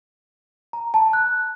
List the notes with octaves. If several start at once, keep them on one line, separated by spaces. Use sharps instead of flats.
A#5
A5
F#6